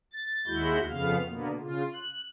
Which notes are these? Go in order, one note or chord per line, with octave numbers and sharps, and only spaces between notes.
A6
D#2 G#3 E4 F#4 G6
F2 C#3 B3 F5
B2 D3 A#3 B3
C#3 F4
F#6